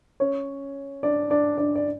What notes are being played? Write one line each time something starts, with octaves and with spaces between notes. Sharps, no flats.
C#4 C#5
D4 D5
D4 D5
D4 D5
D5